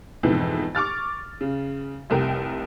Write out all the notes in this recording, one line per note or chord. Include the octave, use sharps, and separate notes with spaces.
F2 G#2 B2 E3
C#6 D6 F6 A6
C#3
F1 C2 A#4 G5